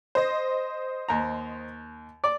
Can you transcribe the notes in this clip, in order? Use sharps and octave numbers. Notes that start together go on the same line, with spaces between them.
C5 D#5
D#2 A#5
D5